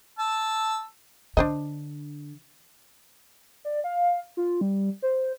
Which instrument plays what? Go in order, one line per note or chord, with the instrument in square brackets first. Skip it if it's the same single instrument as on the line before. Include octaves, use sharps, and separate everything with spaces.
[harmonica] A5 E6
[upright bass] D3 [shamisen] D4 C5 D#5
[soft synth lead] D5
F5
F4
G3
C5